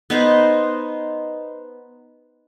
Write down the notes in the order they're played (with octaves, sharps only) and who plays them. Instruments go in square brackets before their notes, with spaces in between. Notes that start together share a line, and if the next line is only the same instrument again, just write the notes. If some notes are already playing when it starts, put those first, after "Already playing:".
[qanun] B3 D#4 C5